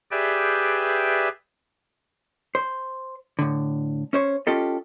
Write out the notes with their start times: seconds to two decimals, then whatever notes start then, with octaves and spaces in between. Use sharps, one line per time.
0.11 G4 G#4 B4 D5 E5 G5
2.55 C5
3.39 A2 D3
4.13 C#4 C5 C#5
4.47 C#4 F4 G4 A4 D#5